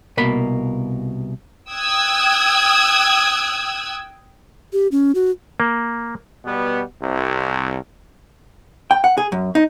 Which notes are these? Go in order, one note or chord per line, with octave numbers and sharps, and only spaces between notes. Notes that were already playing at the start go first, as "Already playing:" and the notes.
C2 B2 A#3 B5
G5 D#6 E6 F#6 G#6
G4
C#4
F#4
A#3
B2 G3 B3
C2
G5
F#5
G#4
F#2
D#4